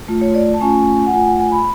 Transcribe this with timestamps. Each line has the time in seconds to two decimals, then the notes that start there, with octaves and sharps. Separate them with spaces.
0.08 A3 F4
0.21 C#5
0.35 D5
0.54 A5
0.61 A3 C#4 F4 G#5
1.06 F#5
1.14 A3 F4 G#5
1.26 F#5
1.39 G#5
1.52 B5